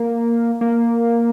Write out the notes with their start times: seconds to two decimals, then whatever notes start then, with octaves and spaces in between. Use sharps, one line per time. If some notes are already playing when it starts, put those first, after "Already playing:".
Already playing: A#3
0.61 A#3